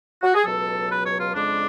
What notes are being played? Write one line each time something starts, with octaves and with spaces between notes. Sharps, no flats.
F#4
G#4
C#2 B2 F#3 A4
B4
C#5
F4
F2 C#3 G#3 D4